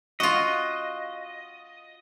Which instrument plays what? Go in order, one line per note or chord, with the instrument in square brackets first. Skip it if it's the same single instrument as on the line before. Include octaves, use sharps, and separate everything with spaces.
[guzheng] F4 F#4 [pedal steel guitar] D#5